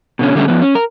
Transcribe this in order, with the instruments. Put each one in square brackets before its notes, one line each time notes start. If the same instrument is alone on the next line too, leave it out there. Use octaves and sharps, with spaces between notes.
[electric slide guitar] B2 D3 C#4
D3 G3 A3 A#3 C#4
F3 B3
C#4
A#4